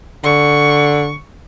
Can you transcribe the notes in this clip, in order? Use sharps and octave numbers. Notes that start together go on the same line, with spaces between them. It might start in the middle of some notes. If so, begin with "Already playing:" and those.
D3 C#6